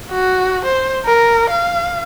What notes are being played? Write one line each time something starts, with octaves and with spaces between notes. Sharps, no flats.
F#4
C5
A#4
F5